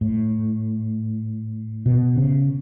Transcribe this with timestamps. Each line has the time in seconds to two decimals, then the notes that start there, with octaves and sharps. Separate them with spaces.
0.01 A2
1.86 B2
2.16 C#3